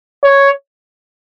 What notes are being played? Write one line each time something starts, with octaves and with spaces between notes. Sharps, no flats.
C#5